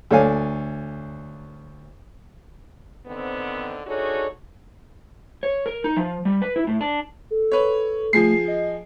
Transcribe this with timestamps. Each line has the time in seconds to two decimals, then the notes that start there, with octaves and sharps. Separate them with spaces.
0.11 D2 A4 C#5 D5 F5 G#5
3.07 D3 D#3 B3 C4
3.86 D4 D#4 F#4 G#4 A4 C#5
5.43 C#5
5.66 A#4
5.84 D#4
5.96 F3
6.25 G3
6.42 B4
6.56 E4
6.67 A2
6.81 D4
7.31 A4
7.52 B4 C#5
8.13 F3 A3 G#4 C7
8.48 D#5